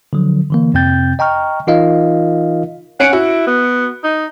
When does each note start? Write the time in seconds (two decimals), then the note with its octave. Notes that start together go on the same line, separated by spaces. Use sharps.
0.13 D3 F3 F#3
0.50 D3 E3 A#3
0.74 F2 C3 C4 G5 G6 A6
1.19 D#5 G5 A#5 C#6 F6
1.67 E3 D#4 F4 A#4 D#5 F5
3.00 C#4 F#5 C#7 D7
3.13 E4 F#4
3.47 B3
4.04 D#4